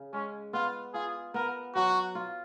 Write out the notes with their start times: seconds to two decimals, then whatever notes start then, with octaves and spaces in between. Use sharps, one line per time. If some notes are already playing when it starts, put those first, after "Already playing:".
Already playing: C#3
0.13 G#3 C#4
0.53 B3 F4
0.94 F4 G#4
1.34 B3 A#4
1.75 F#3 F#4
2.15 F4